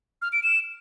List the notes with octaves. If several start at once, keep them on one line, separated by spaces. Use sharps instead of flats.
F6
D7
E7